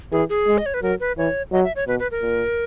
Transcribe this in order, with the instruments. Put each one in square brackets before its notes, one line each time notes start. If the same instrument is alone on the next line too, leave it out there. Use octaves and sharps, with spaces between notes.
[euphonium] E3 [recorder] G#4
[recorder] G#4
[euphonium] G#3
[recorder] D#5
C#5
B4
[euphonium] F#3 [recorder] A#4
[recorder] B4
[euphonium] E3 [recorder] C#5
[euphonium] F#3 [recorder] D#5
[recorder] E5
C#5
[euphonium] B2 [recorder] B4
[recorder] B4
A#4
[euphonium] A#2